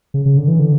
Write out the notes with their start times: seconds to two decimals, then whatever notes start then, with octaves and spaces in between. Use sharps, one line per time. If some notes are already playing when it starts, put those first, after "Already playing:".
0.14 C#3
0.26 C#3
0.37 D3
0.48 E3
0.59 D3